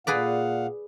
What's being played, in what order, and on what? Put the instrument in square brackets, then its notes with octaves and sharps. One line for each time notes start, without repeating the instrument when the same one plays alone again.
[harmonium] A#2 F5 F#5 [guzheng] G#4 B4 D5